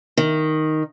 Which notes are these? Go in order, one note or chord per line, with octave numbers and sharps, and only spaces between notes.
D#3